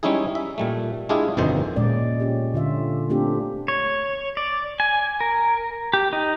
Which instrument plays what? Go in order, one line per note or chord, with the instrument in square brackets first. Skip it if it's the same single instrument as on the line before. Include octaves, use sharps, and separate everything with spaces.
[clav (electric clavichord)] G3 G#3 C#4 D#4 E4 G#4
E5
A#2 G3 A3
G#3 D4 E4 F4 G4 G#4
G1 F2 B2 D#3 C5
[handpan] A#2 G#3 C#4 D5
C#4 G4
D3 F4 E5
A3 B3 C4 D4 F4 G4
[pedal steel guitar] C#5
D5
G#5
A#4
G4
D#4